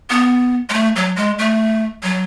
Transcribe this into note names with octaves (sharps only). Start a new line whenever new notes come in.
B3
G#3
A3
F#3
G#3
A3
F#3